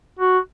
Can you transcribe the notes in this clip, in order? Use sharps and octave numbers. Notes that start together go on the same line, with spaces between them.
F#4